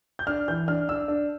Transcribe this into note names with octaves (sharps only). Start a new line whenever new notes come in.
G6
D4 F6
E3 G6
D4 F6
D4 E6
D4